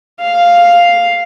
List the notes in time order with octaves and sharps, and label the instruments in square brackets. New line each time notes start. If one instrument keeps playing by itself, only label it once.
[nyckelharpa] F5